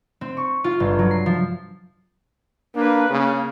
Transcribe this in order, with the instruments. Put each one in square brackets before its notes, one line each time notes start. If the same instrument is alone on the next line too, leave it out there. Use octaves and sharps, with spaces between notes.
[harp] C4
C#6
F4
G1
F#3
C7
F3
[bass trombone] A#3 [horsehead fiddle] D4 B4
[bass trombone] C#3 [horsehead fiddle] A#3